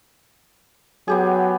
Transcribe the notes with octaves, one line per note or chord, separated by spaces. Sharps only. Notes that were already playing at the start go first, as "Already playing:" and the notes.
F#3 B3 G4 G#4